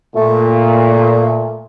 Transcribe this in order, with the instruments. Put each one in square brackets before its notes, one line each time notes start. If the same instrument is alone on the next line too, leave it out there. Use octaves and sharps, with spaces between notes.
[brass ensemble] A#2 [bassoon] A3